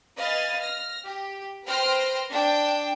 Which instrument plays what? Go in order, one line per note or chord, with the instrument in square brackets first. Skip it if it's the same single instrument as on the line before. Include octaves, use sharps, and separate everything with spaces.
[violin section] B4 D#5 F5 G#5 A6
F6 A#6
G4
B4 C5 G5 C6 F6 A#6
D4 G5